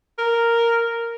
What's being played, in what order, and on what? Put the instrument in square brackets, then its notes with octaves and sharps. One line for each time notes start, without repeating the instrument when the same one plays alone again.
[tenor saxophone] A#4